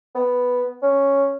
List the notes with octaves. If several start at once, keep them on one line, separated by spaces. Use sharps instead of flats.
B3
C#4